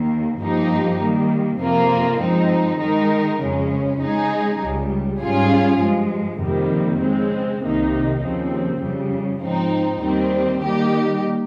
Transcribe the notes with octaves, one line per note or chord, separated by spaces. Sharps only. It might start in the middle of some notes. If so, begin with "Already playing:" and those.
Already playing: D#2 D#3 A#3
G2 F3 A#3 D#4 G4
D#3 G3 A#3
F2 C3 F3 A#3 F4
G2 F3 G#3 C4 D#4
D#3 G#3 D#4 A#4
F2 C#3 G#3 C#4
C#3 G#3 D#4 G#4
C#2 C#3 G3
G#2 G3 C#4 F4 G#4
G2 F3 G#3
F2 C3 D#3 G3 A#3
C#3 G#3 C4
C2 C3 D#3 A#3 D#4
D#2 C#3 F3 C4
F2 C#3 G3
G#2 F3 C4 D#4
D#2 D#3 G3 C4
D#3 G3 A#3 D#4 G4